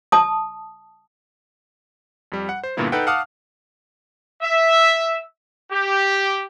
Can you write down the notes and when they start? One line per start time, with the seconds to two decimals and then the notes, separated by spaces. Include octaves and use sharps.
0.12 A5 D#6
2.32 F2 G3
2.49 F#5
2.63 C5
2.77 G2 A#2 D3 A#3 B3 E4
2.92 D#4 A4 B4 F#5 G5
3.07 F5 F#5 A5 D6 D#6 F6
4.42 E5
5.71 G4